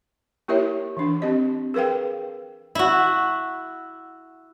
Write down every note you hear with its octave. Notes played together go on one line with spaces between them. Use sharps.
A#3 E4 G4 A#4 C#5 E5
E3 D4
C4 G4 D#5
G#4 A#4 B4 F5 G5
E4 F#4